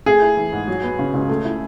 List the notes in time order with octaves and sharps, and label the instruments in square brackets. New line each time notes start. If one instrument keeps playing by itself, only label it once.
[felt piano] A3 [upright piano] G#4
[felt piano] E4
E3
G#2
F#3
B3
C#3
C#2
A3
E4